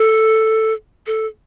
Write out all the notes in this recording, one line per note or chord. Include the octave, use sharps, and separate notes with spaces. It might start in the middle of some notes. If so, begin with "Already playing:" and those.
Already playing: A4
A4